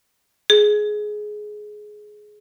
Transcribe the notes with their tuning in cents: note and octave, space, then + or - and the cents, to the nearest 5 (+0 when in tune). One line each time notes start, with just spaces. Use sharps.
G#4 +15